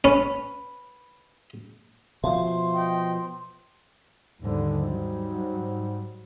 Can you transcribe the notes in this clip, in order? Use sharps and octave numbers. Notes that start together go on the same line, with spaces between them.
C#4 B4
B2 F3 E5 F5 C6
D#5 G5
D#2 G#2 D3 G3
F#3